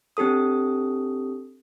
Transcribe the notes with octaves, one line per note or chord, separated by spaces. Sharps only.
C4 D4 G4 A4 D#6